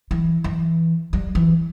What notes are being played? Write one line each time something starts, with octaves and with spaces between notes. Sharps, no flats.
E3
E3
G3
E3